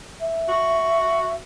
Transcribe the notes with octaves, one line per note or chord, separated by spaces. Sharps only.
E5
F#4